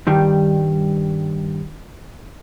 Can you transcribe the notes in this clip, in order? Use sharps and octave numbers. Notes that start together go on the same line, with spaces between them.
G2 D#3 G3